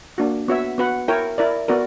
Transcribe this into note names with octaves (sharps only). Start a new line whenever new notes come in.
A#3 D4 F#4
B3 F#4 C#5 E5
B3 F#4 B4 F#5
E4 A#4 C#5 G5
E4 A#4 D5
B3 F#4 A#4 D5